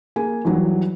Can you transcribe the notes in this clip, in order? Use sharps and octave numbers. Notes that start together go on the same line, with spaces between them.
A#3 G#4 G#5
E2 E3 F#3 G3